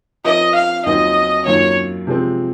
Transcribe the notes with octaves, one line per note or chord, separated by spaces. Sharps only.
F3 C4 F4 A#4 C#5 D#5
F5
D#2 D#3 F#3 C4 F4 D#5
F#2 D#3 A#3 C#4 F4 C#5
C3 F3 G#3 C4